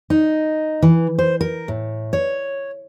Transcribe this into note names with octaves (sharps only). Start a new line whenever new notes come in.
D#4
E3
C5
A#4
A2
C#5